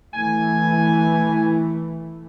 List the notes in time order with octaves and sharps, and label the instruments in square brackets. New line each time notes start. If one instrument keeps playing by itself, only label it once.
[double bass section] E3 A3 [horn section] G#5